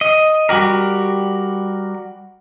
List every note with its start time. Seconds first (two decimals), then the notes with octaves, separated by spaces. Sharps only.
0.01 D#5
0.49 G3 F#4 G4 A#4